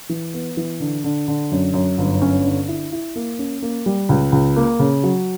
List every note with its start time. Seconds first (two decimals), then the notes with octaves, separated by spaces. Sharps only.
0.09 E3
0.34 B3
0.57 E3
0.80 D3
1.04 D3
1.28 D3
1.51 F#2
1.74 F#2
1.98 G1
2.21 C#4
2.45 D3
2.68 E4
2.92 E4
3.16 A#3
3.39 C#4
3.62 A#3
3.86 G3
4.09 C#2
4.32 C#2
4.56 A#3
4.79 C#3
5.04 F#3